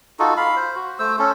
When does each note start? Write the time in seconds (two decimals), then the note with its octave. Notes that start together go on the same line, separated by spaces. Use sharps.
0.19 D#4 F4 F#4 A4
0.37 F5 B5
0.56 C5
0.76 F#4
0.99 A3 C5 E6
1.19 C#4 A4